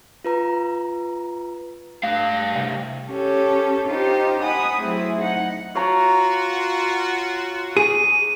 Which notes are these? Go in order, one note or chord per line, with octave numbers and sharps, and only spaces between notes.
F4 B4 A#5
G2 A3 F5 A#6
C2
C#4 G4 A4 C#5
D#4 F4 G4 C5
F#5 G#5 B5 D#6
F#3 A3 C4 E4 G#4
D#4 F#5
F4 F#4 C#5 A#5
G#4 D#7